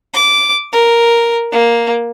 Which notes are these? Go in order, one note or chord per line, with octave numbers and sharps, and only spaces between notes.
D6
A#4
A#3